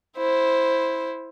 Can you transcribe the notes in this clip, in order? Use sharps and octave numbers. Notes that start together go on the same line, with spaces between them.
E4 C5